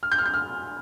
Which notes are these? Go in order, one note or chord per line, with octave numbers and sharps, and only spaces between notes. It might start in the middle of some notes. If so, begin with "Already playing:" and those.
F6
G6
F6
G6
F6